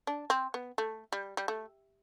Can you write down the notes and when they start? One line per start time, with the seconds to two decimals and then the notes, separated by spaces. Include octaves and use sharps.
0.07 D4
0.30 C4
0.54 B3
0.78 A3
1.13 G3
1.37 G3
1.48 A3